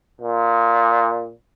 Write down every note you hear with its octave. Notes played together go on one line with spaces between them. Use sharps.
A#2